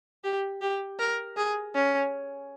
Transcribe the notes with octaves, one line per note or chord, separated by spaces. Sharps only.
G4
G4
A#4
G#4
C#4